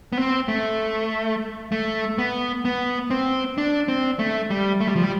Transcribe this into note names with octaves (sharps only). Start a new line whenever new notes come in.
B3
C4
A3
A3
B3
B3
C4
D4
C4
A3
G3
A3
G3
F3
G3